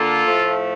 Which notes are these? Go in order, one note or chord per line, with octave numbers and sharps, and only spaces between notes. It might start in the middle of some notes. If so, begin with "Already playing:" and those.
Already playing: D3 A#3 F4 A4
A2 F3 A3